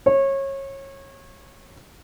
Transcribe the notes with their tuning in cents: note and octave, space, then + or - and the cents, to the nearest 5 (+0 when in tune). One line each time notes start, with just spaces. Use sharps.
C#5 -25